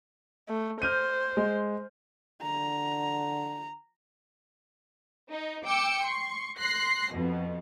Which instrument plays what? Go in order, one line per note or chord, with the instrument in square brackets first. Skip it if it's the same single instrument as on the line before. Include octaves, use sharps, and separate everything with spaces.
[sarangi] A3
[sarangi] C5 [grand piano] F6 G6 D#7
[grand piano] G#3
[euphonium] D3 [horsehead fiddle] A#5
[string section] D#4
G5 D6 E6 C#7
C6 C#6
C6 F#6 A#6 C7
F2 B2